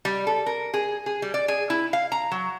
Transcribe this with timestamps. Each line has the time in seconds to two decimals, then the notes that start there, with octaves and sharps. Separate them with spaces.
0.05 G3
0.27 A4
0.46 A#4
0.74 G#4
1.06 G#4
1.22 G3
1.34 D5
1.48 G#4
1.70 E4
1.93 F5
2.12 A#5
2.32 F#3